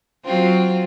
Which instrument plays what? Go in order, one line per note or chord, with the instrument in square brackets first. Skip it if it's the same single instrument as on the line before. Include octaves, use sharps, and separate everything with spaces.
[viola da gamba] F#3 F4 [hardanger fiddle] C4